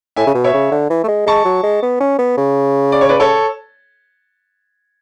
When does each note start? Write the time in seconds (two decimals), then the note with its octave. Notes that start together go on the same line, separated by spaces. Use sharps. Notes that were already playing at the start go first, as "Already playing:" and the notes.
0.16 A2 E5 G#5
0.27 C#3
0.35 B2
0.44 C#5 E5
0.54 C#3
0.72 D3
0.90 E3
1.04 A3
1.08 G#3
1.26 G#3 A5 C#6
1.45 F#3
1.63 G#3
1.82 B3
2.00 C#4
2.19 B3
2.37 C#3
2.92 D5
3.01 C#5
3.09 B4 D5
3.20 A4 C#5